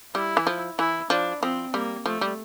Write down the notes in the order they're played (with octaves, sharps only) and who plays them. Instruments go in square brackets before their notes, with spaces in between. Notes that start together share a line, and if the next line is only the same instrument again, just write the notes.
[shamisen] G3 [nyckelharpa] E4
[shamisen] E3
F3
[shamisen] E3 [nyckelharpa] E4
[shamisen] F3 [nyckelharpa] D4
[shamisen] F3 [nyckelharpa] C4
[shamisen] G3 [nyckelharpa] A#3
[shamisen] F3 [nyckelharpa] A3
[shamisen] G3